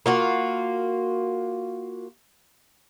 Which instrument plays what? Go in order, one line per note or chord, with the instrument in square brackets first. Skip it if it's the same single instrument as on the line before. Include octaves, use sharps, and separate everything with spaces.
[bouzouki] A#3 F4 F#4